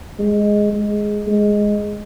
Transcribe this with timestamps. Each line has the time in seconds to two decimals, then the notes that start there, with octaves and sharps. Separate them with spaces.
0.19 G#3
0.73 G#3
1.27 G#3